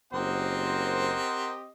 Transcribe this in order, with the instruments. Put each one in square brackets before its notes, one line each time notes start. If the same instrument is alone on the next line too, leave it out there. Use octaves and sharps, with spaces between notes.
[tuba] F#1 [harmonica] C4 G4 D#5 [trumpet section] A#4 C5 F#5